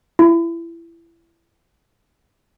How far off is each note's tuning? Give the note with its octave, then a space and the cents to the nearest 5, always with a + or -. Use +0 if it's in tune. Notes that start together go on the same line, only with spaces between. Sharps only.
E4 +25